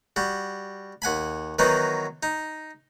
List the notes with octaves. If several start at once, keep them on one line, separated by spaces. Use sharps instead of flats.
G3 F#4
D#2 F#5 G#5 B5
D#3 E3 F#3 B3 D#4
D#4